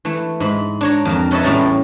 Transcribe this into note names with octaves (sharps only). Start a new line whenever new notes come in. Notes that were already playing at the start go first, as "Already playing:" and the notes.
E3 A3
G#2 B5
D4 C#5 A#5
F2 A#4 A5
A4 B4 C#5 D#5 E5 A5
E2 A2 G3 C#4 A5 A#5